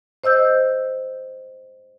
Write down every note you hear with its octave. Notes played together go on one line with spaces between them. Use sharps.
C5 D#5 E6 G6